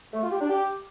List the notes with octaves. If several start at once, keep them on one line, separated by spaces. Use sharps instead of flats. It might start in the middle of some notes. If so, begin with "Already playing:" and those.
A3
F4
G4
D4
G4